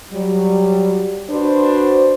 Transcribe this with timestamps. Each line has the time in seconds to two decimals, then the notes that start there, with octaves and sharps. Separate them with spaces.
0.12 F#3 G3
1.30 D4 F#4 B4 C5